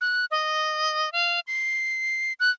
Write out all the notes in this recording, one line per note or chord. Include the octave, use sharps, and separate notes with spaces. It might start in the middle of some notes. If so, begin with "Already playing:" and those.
F#6
D#5
F5
C7
F#6